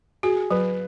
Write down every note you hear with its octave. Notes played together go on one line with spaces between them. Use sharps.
F#4 G#4
F#3 B4